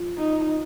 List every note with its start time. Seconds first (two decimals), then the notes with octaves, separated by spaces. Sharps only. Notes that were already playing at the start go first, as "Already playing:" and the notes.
Already playing: F3
0.18 D#4